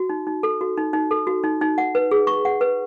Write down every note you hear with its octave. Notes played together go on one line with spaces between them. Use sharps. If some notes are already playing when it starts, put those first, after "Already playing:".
Already playing: F#4
D#4
D#4
A4
F#4
D#4
D#4
A4
F#4
D#4
D#4
F#5
B4
G#4
C#6
F#5
B4